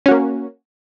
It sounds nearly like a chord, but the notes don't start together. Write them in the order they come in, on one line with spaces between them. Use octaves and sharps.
C#4 F#4 A#3